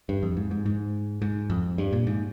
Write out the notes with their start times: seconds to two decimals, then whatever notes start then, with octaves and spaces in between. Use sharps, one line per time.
0.09 G2
0.23 F2
0.37 G#2
0.51 G#2
0.66 G#2
1.22 G#2
1.50 F2
1.78 G2
1.93 A#2
2.07 G#2